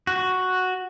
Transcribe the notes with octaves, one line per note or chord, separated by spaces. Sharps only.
F#4